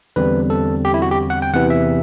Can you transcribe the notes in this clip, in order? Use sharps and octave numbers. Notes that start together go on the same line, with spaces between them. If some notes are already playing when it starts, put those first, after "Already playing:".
E2 D3 G3 C4 B4
A4
G4
E4
F#4
G4
F#5
G5
E2 C3 E3 F#5
E5